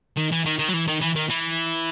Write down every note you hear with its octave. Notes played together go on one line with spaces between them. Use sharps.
D#3
E3
D#3
D#3
F#3
E3
D#3
E3
D#3
E3